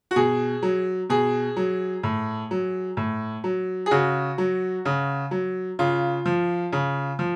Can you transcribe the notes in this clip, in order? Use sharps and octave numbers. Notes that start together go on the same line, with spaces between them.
F#4
B2 G#4
F#3
B2 G#4
F#3
A2
F#3
A2
F#3
G#4
C#3 F#4
F#3
C#3
F#3
C#3 F4
F3
C#3
F3